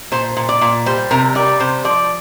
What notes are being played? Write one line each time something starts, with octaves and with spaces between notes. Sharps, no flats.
A#2 C5
A#2
D5
A#2
G3 C5
C3 A#4
G3 D5
C3 C5
F3 D5